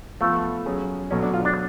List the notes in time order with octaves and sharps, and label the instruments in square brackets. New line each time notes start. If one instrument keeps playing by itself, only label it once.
[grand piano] F3 B3 F4 A4 [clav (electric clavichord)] A3
[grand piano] F#3 C#4 G#4
[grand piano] B2 F#3 A3 [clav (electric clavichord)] C#4
[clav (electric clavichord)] D4
F4
D4